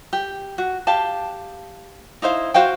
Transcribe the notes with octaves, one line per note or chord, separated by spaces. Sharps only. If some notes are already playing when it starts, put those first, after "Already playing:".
G4
F#4
G4 F5 A5
D#4 E4 C5 F5
F#4 C5 F5 G5